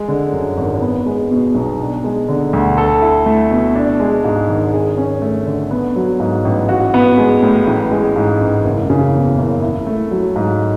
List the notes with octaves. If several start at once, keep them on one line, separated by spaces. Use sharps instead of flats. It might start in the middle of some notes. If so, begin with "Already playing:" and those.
Already playing: G#3
D3
F#2
G#1
B3
G#3
B2
B1
D4
G#3
D3
D2
A4
E4
A3
B2
D4
G#3
G#2
G#1
G#4
C#4
A3
D3
B3
F#3
G#2
A1
F#4
B3
G#3
A2
A1
G#3
G#2
A1
F#1
C#3
E2
F#1
E4
A3
F#3
G#2